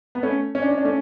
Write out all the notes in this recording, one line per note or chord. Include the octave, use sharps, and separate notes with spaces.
B3
A3 C#4
C#4
D4
C#4
D4
A3 C#4